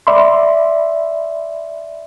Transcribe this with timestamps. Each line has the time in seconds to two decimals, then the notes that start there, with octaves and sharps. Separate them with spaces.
0.07 D5 E5 B5 C6